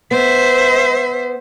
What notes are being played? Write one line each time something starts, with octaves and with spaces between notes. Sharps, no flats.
B3 C5 E5